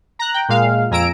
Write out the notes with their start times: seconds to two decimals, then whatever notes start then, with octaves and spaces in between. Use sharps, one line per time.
0.19 A#5 F#6
0.34 G5
0.49 A#2 G#3 F5
0.91 F2 G#5 A#5 E6 D7